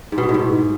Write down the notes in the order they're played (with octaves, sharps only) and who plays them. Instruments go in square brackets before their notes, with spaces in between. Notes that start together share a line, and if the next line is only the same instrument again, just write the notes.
[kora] G#2
B2
G#2
A2
G#2